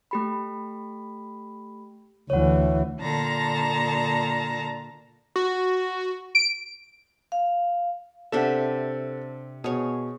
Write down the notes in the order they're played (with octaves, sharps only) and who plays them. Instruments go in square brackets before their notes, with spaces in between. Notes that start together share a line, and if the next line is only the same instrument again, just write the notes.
[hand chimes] A3 G4 B5
[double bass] D2 E3 [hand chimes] C#5 F#5
[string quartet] A#2 D3 A5 A#5 A#6
[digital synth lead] F#4
[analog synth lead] D7
[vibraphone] F5
[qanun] C3 D4 E5 [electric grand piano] A4 F#5
[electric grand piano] B2 [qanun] G#4 C#5